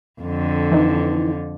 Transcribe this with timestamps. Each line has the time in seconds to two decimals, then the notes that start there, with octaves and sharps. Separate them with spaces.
0.21 F2 D3
0.72 E3 D#4